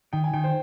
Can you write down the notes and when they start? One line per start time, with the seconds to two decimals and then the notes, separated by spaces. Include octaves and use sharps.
0.13 D#3 G5
0.24 G#5
0.34 D#3 G5
0.44 C5